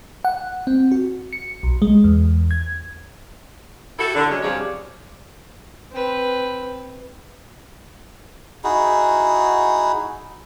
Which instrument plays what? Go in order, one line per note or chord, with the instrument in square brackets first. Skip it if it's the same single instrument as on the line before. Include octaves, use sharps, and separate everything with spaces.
[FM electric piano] F#5
C4
F#4
C#7
B1
G#3
E2
G#6
[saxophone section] E4 F#4 G4 A4
D3
F#3 G#3 C#4
G2 C3 F3 G#4 C#5 D5
[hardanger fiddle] C4 B4
[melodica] D#4 E4 F#4 G#4